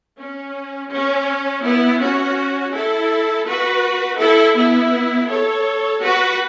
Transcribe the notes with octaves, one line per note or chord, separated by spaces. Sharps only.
C#4
C#4
B3 E4
C#4 F#4
E4 A4
F#4 B4
E4 A4
B3 E4
A4 C#5
F#4 B4